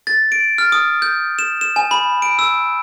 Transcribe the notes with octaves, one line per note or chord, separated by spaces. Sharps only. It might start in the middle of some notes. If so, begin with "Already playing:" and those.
A6
D7
F6
D#6
G6
E7
E7
G#5
B5
D7
E6